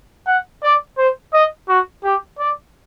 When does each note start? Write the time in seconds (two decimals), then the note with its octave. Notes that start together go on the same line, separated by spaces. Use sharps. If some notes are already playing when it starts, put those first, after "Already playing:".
0.27 F#5
0.63 D5
0.98 C5
1.34 D#5
1.69 F#4
2.04 G4
2.39 D5